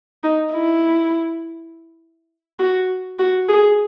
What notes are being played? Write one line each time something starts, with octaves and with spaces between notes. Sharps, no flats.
D#4
E4
F#4
F#4
G#4